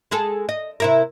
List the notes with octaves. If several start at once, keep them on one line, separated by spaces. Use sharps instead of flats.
G#3 G#4 A4
D#5
C3 E4 A#4